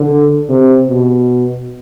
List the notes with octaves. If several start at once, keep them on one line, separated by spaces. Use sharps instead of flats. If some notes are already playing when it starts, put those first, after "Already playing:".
Already playing: D3
C3
B2